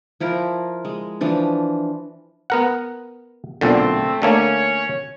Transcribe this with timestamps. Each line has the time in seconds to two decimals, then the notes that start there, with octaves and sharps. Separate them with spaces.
0.20 F3 E4 F4 A#4
0.85 G#3
1.21 E3 F3 D4
2.50 B3 A#4 F#5
3.61 B1 A#2 D3 A3 C4
4.22 D3 A3 A#3 C#4 C#5